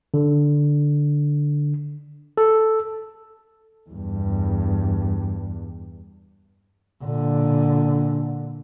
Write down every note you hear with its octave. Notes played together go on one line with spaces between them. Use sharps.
D3
A4
E2 G2
A#2 D3